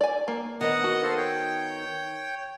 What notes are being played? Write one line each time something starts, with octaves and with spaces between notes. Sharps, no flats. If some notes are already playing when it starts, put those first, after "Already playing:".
D5 G#5
A#3
D#3 B3 D#4 D#5 F#5 D#6
F#4
A4 C5 F5
C#5 G5